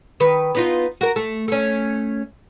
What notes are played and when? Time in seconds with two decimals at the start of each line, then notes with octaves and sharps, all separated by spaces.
0.20 D#3 B4
0.55 B3 D#4 F4
1.01 F#4 A#4
1.16 A3
1.48 A3 C#4